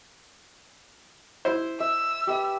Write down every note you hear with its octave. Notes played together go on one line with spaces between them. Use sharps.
E4 C5
E5 E6
G4 B4 E5